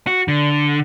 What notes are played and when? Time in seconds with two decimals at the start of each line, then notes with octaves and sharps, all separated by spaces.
0.07 F#4
0.28 D3